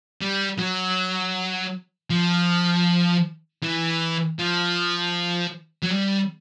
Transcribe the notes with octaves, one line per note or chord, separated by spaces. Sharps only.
G3
F#3
F3
E3
F3
F#3
G3